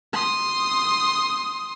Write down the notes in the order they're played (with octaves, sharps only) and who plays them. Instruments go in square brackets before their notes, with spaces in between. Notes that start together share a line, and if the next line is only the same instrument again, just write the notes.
[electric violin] C6 D#6